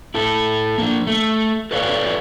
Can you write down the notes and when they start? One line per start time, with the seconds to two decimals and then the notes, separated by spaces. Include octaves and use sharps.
0.14 E4 A4
0.78 A#3 D4
1.07 A3
1.71 A4 B4 C#5 D5 E5 F5